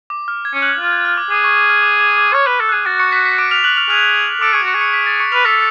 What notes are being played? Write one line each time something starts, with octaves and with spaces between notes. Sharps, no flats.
D6
F6
G#6
C#4
F#6 F#7
F4 G#6
G#6
F6
D6
G#4 D6
C#6
D6
F6
D6
D6
D6
C#5 F6
B4
A4
F#6
G#4
F#4 A6
C#6 C#7
B6
B6
D6 D7
F6 F7
F#6 F#7
F6 F7
G#4 F6 F7
A4 D6 D7
G#4 C#6 C#7
F#4 C#6 C#7
G#4
C#6 C#7
B6
A6
C#6 C#7
B4 F6 F7
A4 B6